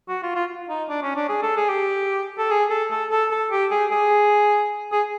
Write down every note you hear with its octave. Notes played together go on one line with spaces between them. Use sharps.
F#4
F4
F4
D#4
D4
C#4
D4
G#4
A4
G#4
G4
A4
G#4
A4
A4
A4
A4
G4
G#4
G#4
G#4